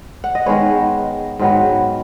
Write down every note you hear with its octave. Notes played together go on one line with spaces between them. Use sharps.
F#5
D#5
D#3 G#3 B3 C#5
G#2 D#3 F#3 B3